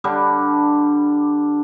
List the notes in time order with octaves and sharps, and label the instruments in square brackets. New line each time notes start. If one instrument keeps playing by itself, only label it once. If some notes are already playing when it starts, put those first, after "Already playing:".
[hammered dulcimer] D3 G3 D4